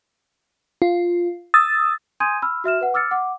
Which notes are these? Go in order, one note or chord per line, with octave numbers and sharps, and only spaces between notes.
F4
D#6 E6 A6
G#5 C6 D#6 G6 G#6 D#7
B5 E6 F6
F#4 E5 F6 E7
B4 F#5
D6 E6 F6 A6 C#7
F#5 D6